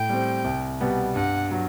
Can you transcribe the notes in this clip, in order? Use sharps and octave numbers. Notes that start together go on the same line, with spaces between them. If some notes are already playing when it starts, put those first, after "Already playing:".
Already playing: A2 G5
G3 C4
C2
B2 G3 B3
G2 F#5
F#3